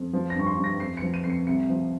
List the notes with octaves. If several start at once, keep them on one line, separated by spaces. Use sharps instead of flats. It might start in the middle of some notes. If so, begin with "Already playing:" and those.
Already playing: F2
F3
A#6
G2 C#6
C6
G2
A#6
F2 C7
F3 C#7
D#7
F2 C7
C#7
C2 C#7
F3